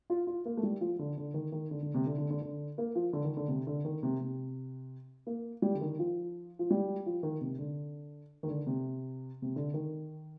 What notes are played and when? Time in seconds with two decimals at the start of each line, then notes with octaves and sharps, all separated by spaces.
0.10 F4
0.27 F4
0.45 A#3
0.57 A3
0.63 G3
0.81 F3
0.99 D3
1.17 D3
1.34 D#3
1.52 D#3
1.71 D3
1.82 D3
1.94 C3
2.06 D3
2.18 D3
2.30 D3
2.42 D3
2.78 A#3
2.95 F3
3.13 D3
3.24 D#3
3.37 D3
3.48 C3
3.67 D3
3.85 D#3
4.03 C3
4.20 C3
5.27 A#3
5.62 G3
5.75 D3
5.81 D#3
5.99 F3
6.59 F3
6.70 G3
7.06 F3
7.23 D#3
7.41 C3
7.59 D3
8.43 D#3
8.48 D3
8.67 C3
9.42 C3
9.56 D3
9.74 D#3